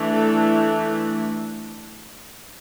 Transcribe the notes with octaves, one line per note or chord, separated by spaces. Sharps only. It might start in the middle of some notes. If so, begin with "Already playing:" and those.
Already playing: E3 A3 D4
A4